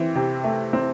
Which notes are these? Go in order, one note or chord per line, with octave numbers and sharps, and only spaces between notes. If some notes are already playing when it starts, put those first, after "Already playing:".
Already playing: E3 C4
C3
A3
C4